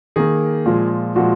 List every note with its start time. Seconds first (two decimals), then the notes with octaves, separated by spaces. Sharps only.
0.16 D#3 A#3 G#4
0.66 A#2 F3 G#3
1.16 A#2 F3 G#3 F#4